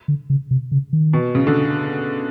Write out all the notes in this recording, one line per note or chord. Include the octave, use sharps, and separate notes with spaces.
D3
C#3
C3
C#3
D#3
B2
C#3
D3